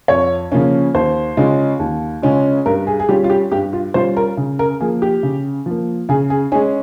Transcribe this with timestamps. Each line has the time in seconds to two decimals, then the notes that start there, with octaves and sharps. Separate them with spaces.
0.08 F2 C#5
0.52 C#3 F3 A#3 C#4
0.94 D#2 C5
1.37 C#3 G#3 C#4 F4
1.80 D#2
2.22 C#3 G#3 C#4 F4
2.66 G2 A#4
2.87 G#4
3.00 G#4
3.09 G3 C#4 F4 G4
3.24 F4
3.30 G4
3.52 G2 G4
3.73 F4
3.94 G3 C#4 F4 C5
4.17 A#4
4.37 C#3
4.59 A#4
4.80 F3 A#3 G#4
5.02 G4
5.23 C#3
5.66 F3 A#3
6.09 C#3 G#4
6.30 G#4
6.52 C#4 G#4
6.55 G#3